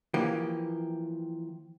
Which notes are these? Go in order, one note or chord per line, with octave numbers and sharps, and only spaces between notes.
E3 F3 A#3 G4